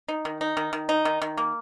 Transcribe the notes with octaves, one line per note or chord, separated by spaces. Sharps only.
D#4
D#3
D#4
D#3
D#3
D#4
D#3
D#3
A#3